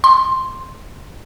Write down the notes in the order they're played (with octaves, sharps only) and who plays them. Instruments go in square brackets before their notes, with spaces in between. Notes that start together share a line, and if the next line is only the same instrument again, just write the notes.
[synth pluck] C6